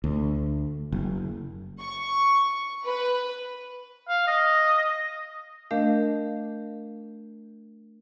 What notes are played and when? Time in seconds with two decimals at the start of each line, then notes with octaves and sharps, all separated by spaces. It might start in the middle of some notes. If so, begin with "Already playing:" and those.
0.04 D2
0.92 F#1
1.81 C#6
2.86 B4
4.09 F5
4.27 D#5
5.71 A3 D4 A#4 D#5 F5 G6